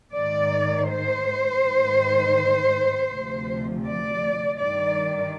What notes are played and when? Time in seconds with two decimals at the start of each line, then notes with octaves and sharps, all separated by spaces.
0.14 G#2 D#3 D5
0.89 C5
1.63 G#2 D#3
3.10 D2 C3 F3
3.84 D5
4.58 G2 D#3 D5